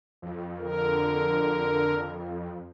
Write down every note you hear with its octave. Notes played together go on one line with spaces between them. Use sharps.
F2
D3 A#4